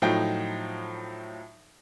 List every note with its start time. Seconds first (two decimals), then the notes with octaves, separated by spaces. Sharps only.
0.02 A2 F3 F#3 D#4 G5